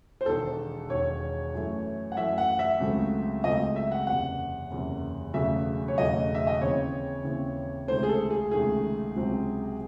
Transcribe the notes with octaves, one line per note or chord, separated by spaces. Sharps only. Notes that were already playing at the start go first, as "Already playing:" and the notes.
C5
E1 E2 D#3 A4
E1 E2 D#3 C#5
F#2 E3 A3
F#5
F#2 E3 A3 E5
F#5
E5
C#2 C#3 F#3 A3 C4
C#2 C#3 F#3 A3 C4 D#5
E5
F#5
F#1 E2 C3 F#5
F#1 E2 C3
E1 E2 C#3 F#3 A3 E5
C#5
E1 E2 C#3 F#3 A3 D#5
E5
D#5
D#2 C#3 E3 C4 C#5
D#2 C#3 E3 C4
C#2 C3 D#3 A3 C5
G#4
A4
G#4
C#2 C3 D#3 A3 G#4
C#2 C3 F#3 C4